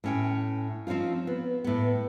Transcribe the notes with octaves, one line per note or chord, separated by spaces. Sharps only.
A2 C#4 G5
F3 C4 C#4 D#4 F4
B3
A2 B3